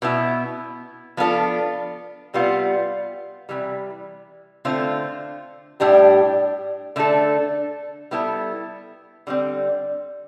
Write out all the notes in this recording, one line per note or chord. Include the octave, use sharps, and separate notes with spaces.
B2 B3 E4
F3 B3 D4 F4 A4
C3 G3 B3 F4
C3 E3 G3
D3 A3 C4 F4
A2 G3 D4 G4
D3 A3 D4 A4
G3 B3 E4 A4
D3 G3 C4